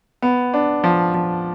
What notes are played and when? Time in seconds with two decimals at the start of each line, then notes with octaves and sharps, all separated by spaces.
0.22 B3
0.54 D4
0.84 F3
1.14 F3